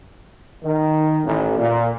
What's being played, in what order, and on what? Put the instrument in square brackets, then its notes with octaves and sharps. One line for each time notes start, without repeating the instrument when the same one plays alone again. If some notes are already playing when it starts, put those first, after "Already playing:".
[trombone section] D#3
A1
A#2